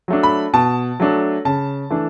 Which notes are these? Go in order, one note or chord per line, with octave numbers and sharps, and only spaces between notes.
F#3 A3 D4
B5
B2 A5
F#3 A3 D4
C#3 A5
E3 A3 D4